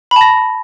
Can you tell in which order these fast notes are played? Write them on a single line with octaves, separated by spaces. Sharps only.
B5 A5 A#6